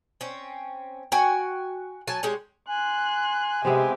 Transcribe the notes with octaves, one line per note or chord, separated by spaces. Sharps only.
C4 C#4
F#4 G5 G#5
F#3 G#5 A5
G#3 G4 C#5
G#5 C6 F#6
C3 G#3 B3 C4 G4 E5